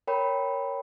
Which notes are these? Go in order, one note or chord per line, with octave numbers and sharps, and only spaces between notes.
A#4 C#5 G5 B5